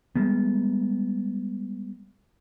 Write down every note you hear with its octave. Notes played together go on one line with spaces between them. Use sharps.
G3 G#3 B3